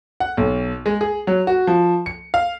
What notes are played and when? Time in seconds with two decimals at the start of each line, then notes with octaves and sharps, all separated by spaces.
0.20 F#5
0.37 B1
0.86 G#3
1.01 G#4
1.27 F#3
1.47 F#4
1.67 F3
2.06 C#7
2.34 F5